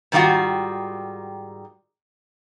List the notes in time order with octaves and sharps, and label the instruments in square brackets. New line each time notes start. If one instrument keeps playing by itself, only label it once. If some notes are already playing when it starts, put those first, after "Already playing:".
[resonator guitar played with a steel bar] G#2 D#3 G3 D#4 F4 F#4